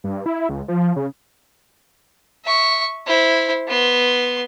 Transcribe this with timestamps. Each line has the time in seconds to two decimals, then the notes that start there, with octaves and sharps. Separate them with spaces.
0.04 G2
0.26 E4
0.49 C#2
0.68 F3
0.96 C#3
2.45 E5 C#6
3.06 E4 C5
3.67 B3 C6